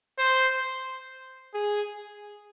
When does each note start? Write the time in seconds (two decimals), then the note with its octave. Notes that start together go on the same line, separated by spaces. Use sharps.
0.18 C5
1.54 G#4